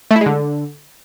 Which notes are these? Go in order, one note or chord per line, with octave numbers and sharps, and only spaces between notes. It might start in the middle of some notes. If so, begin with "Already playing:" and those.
A3
E4
G#3
D3